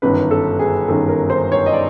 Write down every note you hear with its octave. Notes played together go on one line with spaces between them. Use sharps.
G1 F#2 D#3 B4
A4
G#4
G1 F#2 D#3 A4
A#4
C5
C#5
D#5
D5